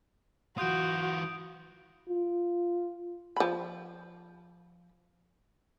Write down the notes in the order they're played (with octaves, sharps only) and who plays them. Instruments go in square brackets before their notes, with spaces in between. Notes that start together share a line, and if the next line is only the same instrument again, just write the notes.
[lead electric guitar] E3 F4 [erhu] F#4 [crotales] D#6 G6 D7
[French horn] F4
[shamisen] F3 B5